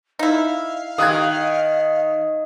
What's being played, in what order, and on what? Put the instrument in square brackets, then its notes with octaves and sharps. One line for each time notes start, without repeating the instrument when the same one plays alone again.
[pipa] D#4 E4 [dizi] F5
[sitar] D#3 [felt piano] D#6 F#6 G#6